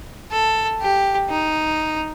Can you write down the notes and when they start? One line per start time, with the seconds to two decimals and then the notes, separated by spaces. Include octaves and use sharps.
0.32 A4
0.81 G4
1.29 D#4